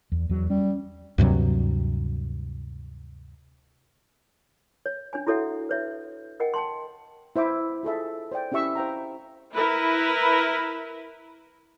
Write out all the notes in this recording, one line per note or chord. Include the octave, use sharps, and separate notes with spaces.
E2
E2 F#3
G3 C#4
D2 G2 C3 F#3
C#5
D4 C#5 G#5
E4 F#4 A4 C#5 E5 F#5
B4 C#5 E5
A#4 D#5 F#5 G5
G5 A5 C6
E4 C5 E5 D6
F4 G#4 A4 E5
C5 D5 G5
C#4 E4 G4 E5 C#6 E6
C5 F5 G5 A#5
E4 A#4 B4